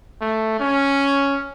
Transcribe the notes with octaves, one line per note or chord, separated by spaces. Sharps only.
A3
C#4